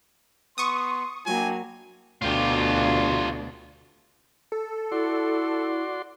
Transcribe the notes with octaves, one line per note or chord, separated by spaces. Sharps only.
B3 C6 C#6 D#6
F#3 A#3 D4 E4 G5 G#5
D2 B2 F4 G4
A4
E4 F#4 D5 C6